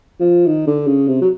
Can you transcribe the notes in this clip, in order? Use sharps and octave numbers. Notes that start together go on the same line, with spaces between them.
F3
D#3
D3
C#3
C3
F#3